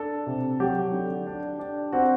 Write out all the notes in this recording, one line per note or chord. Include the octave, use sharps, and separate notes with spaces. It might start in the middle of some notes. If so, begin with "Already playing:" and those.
Already playing: D4 A4
C3
F#3 G4
D3
D4
D4
C4 F#4